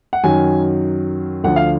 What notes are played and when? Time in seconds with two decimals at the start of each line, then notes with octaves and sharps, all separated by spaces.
0.13 F#5
0.24 F#2 D#3 F#3 G#5
1.44 D2 D3 F3 F#5
1.56 F5